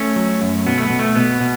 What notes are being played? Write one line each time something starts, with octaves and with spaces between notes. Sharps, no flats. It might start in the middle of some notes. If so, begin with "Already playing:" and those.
Already playing: A3 C#4
F#3
F#2
B2 B3
A3
B3
B2
A3
B2 B3
B2